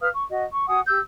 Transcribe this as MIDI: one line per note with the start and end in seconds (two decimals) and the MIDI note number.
0.01 0.08 71
0.01 0.08 77
0.01 0.08 87
0.01 0.08 89
0.12 0.23 85
0.29 0.44 66
0.29 0.44 75
0.52 0.65 85
0.68 0.80 66
0.68 0.80 78
0.68 0.80 80
0.68 0.80 87
0.88 0.99 67
0.88 0.99 88
0.88 0.99 91